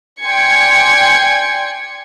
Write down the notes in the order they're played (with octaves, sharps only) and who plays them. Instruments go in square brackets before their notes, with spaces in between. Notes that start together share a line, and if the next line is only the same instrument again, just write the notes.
[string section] D5 G5 G#5 C6 G#6 C#7